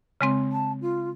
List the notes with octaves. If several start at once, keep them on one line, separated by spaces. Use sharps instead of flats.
C#3 G#3 C4
A5
F4